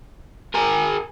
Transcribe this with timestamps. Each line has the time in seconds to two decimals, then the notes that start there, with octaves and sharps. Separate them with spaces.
0.55 G#4 A#4